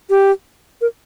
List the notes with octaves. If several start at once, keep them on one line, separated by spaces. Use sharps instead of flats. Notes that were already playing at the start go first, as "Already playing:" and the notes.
G4
A#4